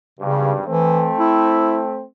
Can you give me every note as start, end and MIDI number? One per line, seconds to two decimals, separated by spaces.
0.19 0.66 32
0.19 0.66 43
0.19 0.53 49
0.68 1.10 52
0.68 2.03 57
0.68 2.03 60
1.19 1.82 64